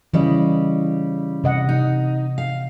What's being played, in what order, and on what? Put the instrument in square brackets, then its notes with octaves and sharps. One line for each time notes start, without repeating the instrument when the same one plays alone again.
[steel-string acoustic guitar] C#3 G3 [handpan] E3 D#5
[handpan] C3 D#5 F#5
[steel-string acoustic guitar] D#4
F5